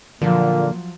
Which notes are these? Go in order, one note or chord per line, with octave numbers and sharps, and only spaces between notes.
A#2 D3 F3 F#3 A#3